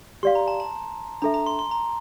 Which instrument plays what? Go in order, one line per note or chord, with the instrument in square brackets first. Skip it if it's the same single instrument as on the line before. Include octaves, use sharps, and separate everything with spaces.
[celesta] G4 D5 F5 [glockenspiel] C6
[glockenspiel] A#5
A5
A5
[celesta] D4 A4 E5 [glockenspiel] A#5
[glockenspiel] A#5
C6
C6
A#5